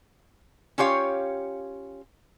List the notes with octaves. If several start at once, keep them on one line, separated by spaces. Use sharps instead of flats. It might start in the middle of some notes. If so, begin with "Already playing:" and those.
C#4 F4 G4 C#5 F5